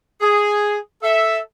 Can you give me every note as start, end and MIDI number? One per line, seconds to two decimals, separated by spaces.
0.21 0.78 68
1.03 1.39 69
1.03 1.39 76